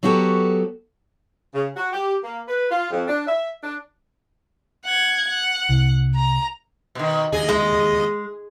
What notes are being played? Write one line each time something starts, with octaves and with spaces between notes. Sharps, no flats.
F#3 B3 F#4 G4 A4
C#3
F#4
G4
A#3
B4
F4
F2
D4
E5
D4
F#5 G#6
F#5
C2
A#5
B2 D#3
D#2 G#4 D#5
G#3